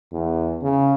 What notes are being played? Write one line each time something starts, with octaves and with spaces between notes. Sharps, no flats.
E2
C#3